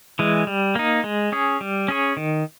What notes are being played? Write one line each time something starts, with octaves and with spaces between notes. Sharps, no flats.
E3 G#3
G3
A#3 D#4
G#3
C#4 G#4
G3
C#4 G#4 C#5
D#3